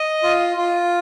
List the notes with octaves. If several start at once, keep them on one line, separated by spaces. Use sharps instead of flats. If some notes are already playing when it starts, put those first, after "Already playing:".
Already playing: D#5
F4
F4